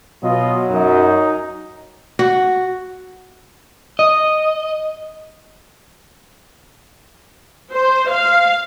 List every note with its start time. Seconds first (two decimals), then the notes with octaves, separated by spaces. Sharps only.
0.24 B2 F#3 F4 D#5
0.70 F#2 D#4
2.19 F#4
3.99 D#5
7.73 C5
8.10 F5